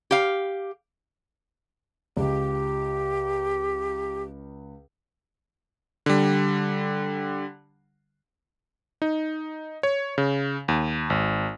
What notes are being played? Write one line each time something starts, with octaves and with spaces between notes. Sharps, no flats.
G4 F5
C#2 G4
D3 G3
D#4
C#5
C#3
D#2
G#1